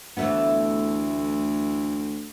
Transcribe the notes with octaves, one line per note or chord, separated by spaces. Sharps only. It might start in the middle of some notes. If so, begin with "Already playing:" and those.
D2 E3 A3 B3